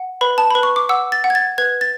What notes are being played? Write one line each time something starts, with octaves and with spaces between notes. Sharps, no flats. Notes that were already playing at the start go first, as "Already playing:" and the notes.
Already playing: F#5
B4 B5
A5
B4 B5
C#6
D6
F#5 E6
A6
F#5
G#6
A6
B4 G#6
A6